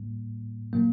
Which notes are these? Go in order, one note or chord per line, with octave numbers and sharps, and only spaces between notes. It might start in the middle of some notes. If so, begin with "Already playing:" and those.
Already playing: A2 G3 A#3
A#2 F#3 A#3